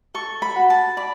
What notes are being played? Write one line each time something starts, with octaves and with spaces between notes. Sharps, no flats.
A4 C#6
B5
F#4
A5
D5 B5